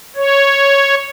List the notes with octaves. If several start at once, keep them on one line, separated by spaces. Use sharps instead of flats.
C#5